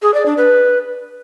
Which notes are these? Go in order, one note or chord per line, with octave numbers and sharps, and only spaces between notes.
G#4
D5
D4
B4